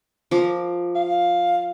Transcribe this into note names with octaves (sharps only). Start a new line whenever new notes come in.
F3 A#4 D6
F5